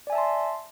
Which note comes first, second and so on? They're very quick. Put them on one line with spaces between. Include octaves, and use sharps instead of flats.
D5 G#5 E5 A5 C6